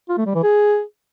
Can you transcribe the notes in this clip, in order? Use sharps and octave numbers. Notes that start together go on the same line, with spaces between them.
F4
A3
G3
E3
G#4